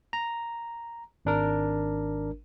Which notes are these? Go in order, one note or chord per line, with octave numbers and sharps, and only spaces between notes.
A#5
G#1 D4 A#4